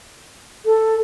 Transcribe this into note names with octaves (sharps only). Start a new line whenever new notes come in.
A4